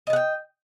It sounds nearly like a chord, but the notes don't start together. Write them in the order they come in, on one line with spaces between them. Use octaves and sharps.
D#5 A5 F#5 G5